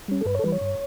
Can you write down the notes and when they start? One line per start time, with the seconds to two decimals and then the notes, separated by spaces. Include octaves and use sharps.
0.08 G3 C#4
0.21 A4
0.25 G2 B4
0.35 C#5
0.39 A4
0.43 E3 G3 B4
0.52 C#5
0.61 G2